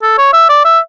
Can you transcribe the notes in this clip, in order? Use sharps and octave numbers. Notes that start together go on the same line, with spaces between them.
A4
C#5
E5
D5
E5